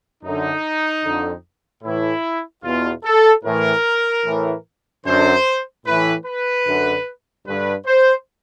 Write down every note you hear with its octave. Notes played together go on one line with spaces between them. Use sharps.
F#2 D3 D#4
F2 D3
A2 E3 E4
E2 B2 F4
A4
A2 E3 A#4
A2 E3
F#2 D3 C5
A2 E3 B4
B4
F#2 D3
G2 D3 B4
C5